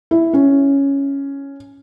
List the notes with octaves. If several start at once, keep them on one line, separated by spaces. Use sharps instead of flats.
E4
C#4